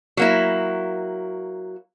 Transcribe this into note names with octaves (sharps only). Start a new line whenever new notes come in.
F#3 A#3 E4